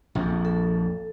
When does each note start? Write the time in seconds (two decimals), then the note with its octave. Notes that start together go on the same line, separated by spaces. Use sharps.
0.15 A#1 F2
0.45 A4